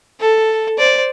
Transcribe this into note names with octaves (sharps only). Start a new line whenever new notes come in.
A4
C5 D5